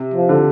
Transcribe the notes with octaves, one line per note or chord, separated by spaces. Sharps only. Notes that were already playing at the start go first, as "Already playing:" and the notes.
Already playing: C3
F3
D3